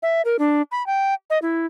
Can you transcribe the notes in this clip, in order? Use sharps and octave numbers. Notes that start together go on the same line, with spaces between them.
E5
A#4
D4
B5
G5
D#5
E4